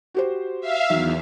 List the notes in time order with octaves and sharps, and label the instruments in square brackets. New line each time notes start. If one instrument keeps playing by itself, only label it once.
[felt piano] F#4 G4 C5
[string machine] E5 F5
[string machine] E2 [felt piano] D#3 F#3 E5